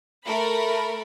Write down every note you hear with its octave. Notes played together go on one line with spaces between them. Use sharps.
A3 A#4 B5